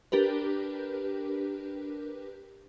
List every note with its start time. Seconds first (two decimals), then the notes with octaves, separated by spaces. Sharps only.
0.12 D4 G4 A#4 B4